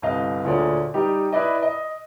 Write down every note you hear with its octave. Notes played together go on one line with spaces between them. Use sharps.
G1 C2 D#5 F5
D2 A#2 D3 G#4 C#5 D5
G3 D#4 G4
E4 B4 D5 D#5
D#5